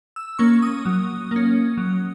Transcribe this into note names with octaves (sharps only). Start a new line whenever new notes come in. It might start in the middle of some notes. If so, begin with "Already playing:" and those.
E6
A#3 C#4 C#6
D#6
F#3
A#3 C#4
F#3